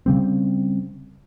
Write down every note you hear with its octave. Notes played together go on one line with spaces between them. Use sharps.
C#3 G3 C4